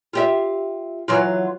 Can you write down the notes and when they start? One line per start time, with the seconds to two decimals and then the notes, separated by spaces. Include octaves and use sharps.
0.13 F4 G4 E5
1.08 E3 F#3 F4